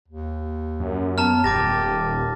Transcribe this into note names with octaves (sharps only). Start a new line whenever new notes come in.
D#2
F#2
B3 A5 A#5 F6
D#1 G4 D6 A6 A#6